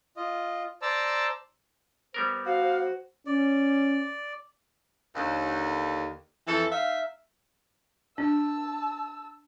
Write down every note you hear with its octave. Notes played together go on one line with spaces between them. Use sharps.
F4 D#5
C5 D5 A5 A#5 E6
G3 B3 A#4 C5
F#4 F5
C#4 D5
D#2 D3
F2 E3 A4
D#4 E5 F5
D4 A5 E6